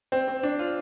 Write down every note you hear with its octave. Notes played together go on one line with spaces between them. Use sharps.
C4
C4
D4
F4